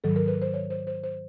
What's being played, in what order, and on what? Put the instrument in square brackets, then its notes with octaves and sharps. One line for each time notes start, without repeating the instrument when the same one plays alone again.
[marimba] G#2 D#3 F#3 A4
A#4
B4
C5
C#5
C5
C5
C5